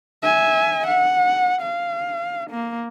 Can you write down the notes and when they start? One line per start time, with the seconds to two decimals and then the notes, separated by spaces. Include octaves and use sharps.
0.23 E5 G#5
0.87 F#5
1.62 F5
2.50 A#3